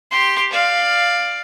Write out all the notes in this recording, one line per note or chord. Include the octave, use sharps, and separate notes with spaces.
G4 C6
D5 F5